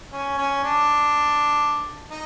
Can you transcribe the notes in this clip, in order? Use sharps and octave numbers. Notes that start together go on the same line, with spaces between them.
C#4
C#4
D4
D#4